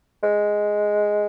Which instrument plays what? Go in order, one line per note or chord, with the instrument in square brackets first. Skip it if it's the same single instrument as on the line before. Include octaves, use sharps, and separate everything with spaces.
[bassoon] G#3